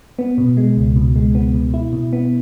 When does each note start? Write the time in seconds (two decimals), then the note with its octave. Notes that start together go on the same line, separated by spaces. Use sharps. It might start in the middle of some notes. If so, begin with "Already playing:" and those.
0.19 B3
0.38 B2
0.57 G#3
0.77 C#2
0.96 B2
1.16 G#3
1.35 B3
1.54 B2
1.74 E4
1.93 B2
2.13 B3